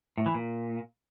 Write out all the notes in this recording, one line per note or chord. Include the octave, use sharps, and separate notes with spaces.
A2
E3
A#2